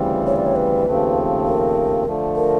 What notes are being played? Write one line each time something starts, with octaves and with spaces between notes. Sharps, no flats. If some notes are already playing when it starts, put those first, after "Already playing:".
Already playing: D2 C#3 E3 G3 C4
C#5
D5
C#5
B4
D#2 C#3 F3 A3 C4
A#4
D3 F3 A3
A#4